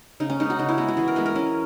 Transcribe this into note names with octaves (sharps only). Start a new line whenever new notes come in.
C#3 D#4
C#4
G#3 B3 D#4
F#4
C#3 D#4
E4
G#3 B3 F#4
F#4
E3 G#4
A#4
G#3 B3 B4
A#4
E3 C#4